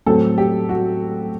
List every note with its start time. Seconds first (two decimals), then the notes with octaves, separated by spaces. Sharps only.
0.07 A2 F#3 C4 A4
0.38 G4
0.69 F#4